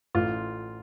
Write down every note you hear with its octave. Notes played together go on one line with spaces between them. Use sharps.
A1 F4